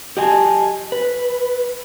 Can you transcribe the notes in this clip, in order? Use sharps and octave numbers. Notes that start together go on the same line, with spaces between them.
G4 D#5 G#5 A5
B4